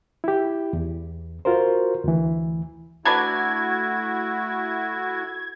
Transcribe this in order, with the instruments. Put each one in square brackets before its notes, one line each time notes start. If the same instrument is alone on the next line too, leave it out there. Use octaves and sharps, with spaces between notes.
[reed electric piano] E4 G4
E2
F4 F#4 A#4 C5
D2 E3
[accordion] A3 E4 F#4 [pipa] D4 B4 D5 [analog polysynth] G#6